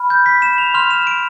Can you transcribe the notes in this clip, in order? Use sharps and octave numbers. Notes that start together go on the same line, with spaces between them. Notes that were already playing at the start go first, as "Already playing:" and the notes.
Already playing: B5 F6
G6
B6
E7
F7
C6 F6 F7
E7
D7